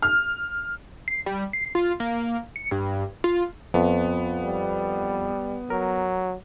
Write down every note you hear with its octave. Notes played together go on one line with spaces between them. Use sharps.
F6
C7
G3
C7
F4
A#3
C#7
G2
F4
F2 B3
G3
F#3 A#4